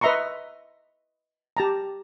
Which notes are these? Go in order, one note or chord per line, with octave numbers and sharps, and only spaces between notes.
B4 D#5 E5 A#5 C6 C#6
G4 A5 A#5